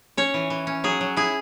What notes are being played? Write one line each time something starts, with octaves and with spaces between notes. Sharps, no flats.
C#4 C#5
E3
E3
C#4
F#3 G#4
F#3
E4 G#4